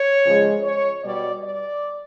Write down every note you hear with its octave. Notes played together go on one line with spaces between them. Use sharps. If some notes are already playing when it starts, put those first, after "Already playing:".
Already playing: C#5
C#3 F3 G#3
C#5
B2 G3 D5
D5